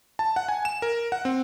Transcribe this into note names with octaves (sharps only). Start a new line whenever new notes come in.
A5
F#5
G#5
E7
A#4
F#5
C4